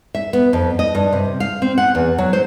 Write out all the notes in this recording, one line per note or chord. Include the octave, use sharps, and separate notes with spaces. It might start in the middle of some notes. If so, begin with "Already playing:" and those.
E5
B3
F2
D#5
G2
C3
F5
C4
F#5
E2
F#3
C5